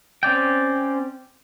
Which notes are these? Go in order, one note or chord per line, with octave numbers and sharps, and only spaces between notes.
C4 C#4 D5 G5